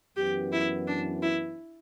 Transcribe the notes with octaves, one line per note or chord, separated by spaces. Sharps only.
F#2 E3 B3 G4
E4
D4
E4